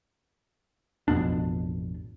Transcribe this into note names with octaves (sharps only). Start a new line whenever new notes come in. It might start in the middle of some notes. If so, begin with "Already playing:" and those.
A1 F2 B2 D4